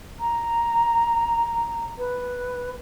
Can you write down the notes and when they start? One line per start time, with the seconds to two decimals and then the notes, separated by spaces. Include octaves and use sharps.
0.20 A#5
1.98 B4